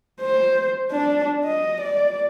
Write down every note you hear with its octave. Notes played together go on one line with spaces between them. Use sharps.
C5
D4
D#5
D5